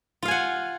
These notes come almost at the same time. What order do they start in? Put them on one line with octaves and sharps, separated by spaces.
F4 F5 G#5 F#5